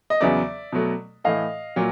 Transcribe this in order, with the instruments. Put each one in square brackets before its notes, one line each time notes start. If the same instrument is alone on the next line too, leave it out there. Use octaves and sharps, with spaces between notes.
[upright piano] D#5
E2 C#3 F#3 B3 D5 E5
B2 F#3 A3
A2 E3 A3 D#5 F5
A#2 F#3